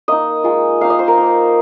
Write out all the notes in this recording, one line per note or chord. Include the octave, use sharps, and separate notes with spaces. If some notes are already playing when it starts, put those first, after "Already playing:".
A#3 D#4 D#5
G#3 F4
A#3 D#4 F5
D#5
C5
A#4
A#3 D#4